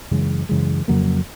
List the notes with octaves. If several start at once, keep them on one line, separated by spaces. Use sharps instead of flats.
F#2 C#3 E3 G#3
F#2 C#3 E3 G#3
F2 C#3 F#3 A#3